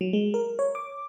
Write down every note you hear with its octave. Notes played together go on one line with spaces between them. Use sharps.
F#3
G#3
A#4
C#5
D6